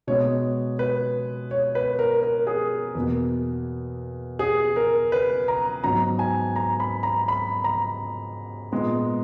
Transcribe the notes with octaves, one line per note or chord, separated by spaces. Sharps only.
B2 G#3 B3 C#5
B4
C#5
B4
A#4
A#4
G#4
E2 B2 A#3
G#4
A#4
B4
A#5
G#2 F#3 B3 A#5
G#5
A#5
B5
A#5
B5
A#5
A#2 G#3 B3